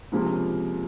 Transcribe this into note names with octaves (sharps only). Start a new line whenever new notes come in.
C#2 C3 F3 A#3